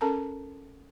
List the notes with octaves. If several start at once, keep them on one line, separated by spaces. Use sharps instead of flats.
C#4 A4 A#4 A5 A#5